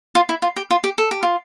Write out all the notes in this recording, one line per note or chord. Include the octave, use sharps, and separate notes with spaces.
F4
E4
F4
G4
F4
G4
A4
G4
F4